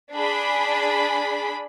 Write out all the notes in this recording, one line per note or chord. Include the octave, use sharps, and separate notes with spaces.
D4 G#4 B5